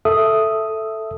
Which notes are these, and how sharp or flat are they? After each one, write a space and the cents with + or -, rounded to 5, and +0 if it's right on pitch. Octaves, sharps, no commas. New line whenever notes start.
A4 +0 E5 +0 D#6 +0